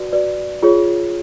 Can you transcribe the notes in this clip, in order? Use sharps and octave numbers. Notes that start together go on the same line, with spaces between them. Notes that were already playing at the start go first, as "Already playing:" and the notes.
Already playing: F#4 B4 D5
F#4 B4 D5
F4 G#4 C#5